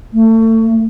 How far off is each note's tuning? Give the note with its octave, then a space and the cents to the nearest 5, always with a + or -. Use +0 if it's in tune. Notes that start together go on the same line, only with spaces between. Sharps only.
A3 +30